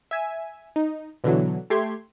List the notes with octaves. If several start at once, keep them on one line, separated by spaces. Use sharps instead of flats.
E5 G#5
D#4
B2 D3 E3 F#3
A3 G4 C6 G#6